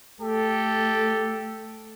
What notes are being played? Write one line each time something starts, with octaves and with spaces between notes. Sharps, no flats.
A3 G4 A4